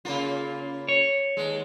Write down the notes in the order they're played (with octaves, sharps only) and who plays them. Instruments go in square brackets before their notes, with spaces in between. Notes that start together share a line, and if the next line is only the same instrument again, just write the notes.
[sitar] C#3 A#3 F4
[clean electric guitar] C#5
[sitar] D#2 G#3